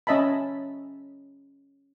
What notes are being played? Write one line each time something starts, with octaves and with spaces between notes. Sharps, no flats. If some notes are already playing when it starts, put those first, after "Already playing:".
C#4 D#5 E5 A5 B5